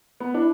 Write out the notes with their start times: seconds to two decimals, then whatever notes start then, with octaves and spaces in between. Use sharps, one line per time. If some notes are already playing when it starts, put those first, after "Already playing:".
0.20 B3
0.34 D4 E4